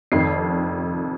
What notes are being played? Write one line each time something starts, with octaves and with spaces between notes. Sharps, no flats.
F1 F2 D#3 C7